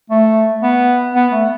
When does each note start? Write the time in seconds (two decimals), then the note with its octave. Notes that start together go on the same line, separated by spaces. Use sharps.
0.10 A3
0.62 B3
1.15 B3
1.32 A3